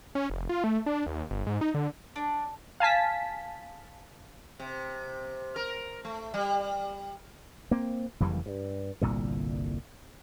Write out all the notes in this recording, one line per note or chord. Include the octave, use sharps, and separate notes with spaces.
C#4
F1
F4
A3
D4
D#2
G1
G#2
D#4
D3
D4
F5 G#5 A5 B6
C3
A#4
A3
G3
A#3 C4
F#1 F2 E3 G3
G2
G1 C2 A#2 D3